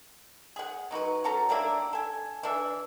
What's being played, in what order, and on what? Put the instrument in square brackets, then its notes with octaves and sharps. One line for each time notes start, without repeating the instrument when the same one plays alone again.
[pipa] G#4 F#5
F#3 D#4 F#4 B4
C#4 F#4 A4 A#5
G3 A#3 D4 E4
A4 G#5
E3 D4 E5